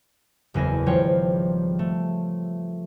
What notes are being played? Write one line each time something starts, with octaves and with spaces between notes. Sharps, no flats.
F#1 E2 G#5 A#6
G#1 F3 G3 F4 C#5 G5
A3